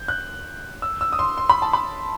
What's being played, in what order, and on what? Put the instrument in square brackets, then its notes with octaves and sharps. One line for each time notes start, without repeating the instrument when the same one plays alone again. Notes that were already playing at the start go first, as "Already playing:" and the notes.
Already playing: [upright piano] G6
F#6
E6
E6
D#6
C6
C6
B5
A5
B5